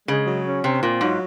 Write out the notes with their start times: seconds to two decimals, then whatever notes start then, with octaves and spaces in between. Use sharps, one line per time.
0.08 C#3 G#3
0.27 F#3
0.45 C#4
0.64 C3 C4
0.82 A#2 F4
1.01 G#2 F#3